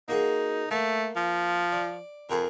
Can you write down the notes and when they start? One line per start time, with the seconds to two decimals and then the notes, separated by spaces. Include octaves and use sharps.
0.08 A#3 D#4 F#4 G#4
0.71 A3 A#3
1.16 F3
1.72 D5
2.30 F2 G#4 A#4